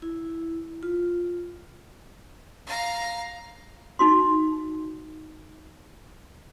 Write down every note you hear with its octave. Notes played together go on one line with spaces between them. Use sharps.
E4
F4
F5 A#5
D#4 F#4 C6